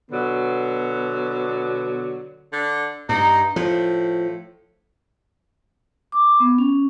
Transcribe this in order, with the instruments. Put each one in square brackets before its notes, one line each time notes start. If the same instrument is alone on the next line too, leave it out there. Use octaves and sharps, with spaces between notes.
[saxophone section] B2 D3 F#3 B3
[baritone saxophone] D3
[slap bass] G2 [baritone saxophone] D#4
[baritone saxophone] A2 [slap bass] F3
[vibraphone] D6
B3
C#4